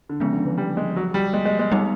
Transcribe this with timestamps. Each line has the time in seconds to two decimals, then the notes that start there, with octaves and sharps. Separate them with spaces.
0.09 D3
0.20 C#3 F3 G#3 B3
0.33 D3
0.45 E3
0.58 G3
0.77 G#3
0.96 F#3
1.14 G3
1.33 G#3
1.45 G#3
1.59 G#3
1.72 G3 G#3 B3 D#4